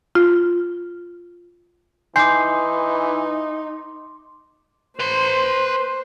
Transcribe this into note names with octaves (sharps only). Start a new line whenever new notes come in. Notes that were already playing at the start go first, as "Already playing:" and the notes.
F4
E3 D#4 G#5 C6 D6 G6 C7
B4 C5 C6